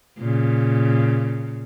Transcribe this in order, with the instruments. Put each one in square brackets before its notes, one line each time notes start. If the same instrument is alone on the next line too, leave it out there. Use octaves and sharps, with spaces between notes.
[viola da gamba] A#2 C#3